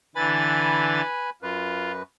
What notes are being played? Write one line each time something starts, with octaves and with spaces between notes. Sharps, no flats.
D3 E3 B4 G#5 B5 A6
F#2 F4 B4